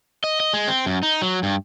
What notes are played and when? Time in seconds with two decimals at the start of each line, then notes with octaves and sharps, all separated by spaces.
0.24 D#5
0.40 D#5
0.53 G#3
0.68 C4
0.86 F#2
1.03 D#4
1.22 F#3
1.43 G2